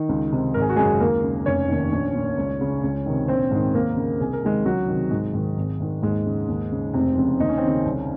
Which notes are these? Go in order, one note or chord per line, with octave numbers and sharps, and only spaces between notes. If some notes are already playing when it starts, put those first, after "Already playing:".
Already playing: D#3 D#4
C#2
C3 D#3
G#1 A#4
G#4
F#4
F#2 C#3 G#3 G#4
D#2 A#3 A#4
C#3
F1 C#4 C#5
D#2 D#3
A#1
A#2
C#2
C#3
C#2
C3 D#3
A#1 C4 C5
G#2 D#3
D#2 A#3 A#4
C#3
C2 G#4
A#4
C3 D#3 G#3 G#4
C#2 F#3 F#4
C3 D#3
G#1 G#2 G#3
G#2 D#3
G#1
G#2 D#3
D#2 G#2 G#3
C#3
D#2
C#3
F1 C3 C4
F2 C#3
D#2 D#4
C#4
C4
D#3
C#3 C#4
C2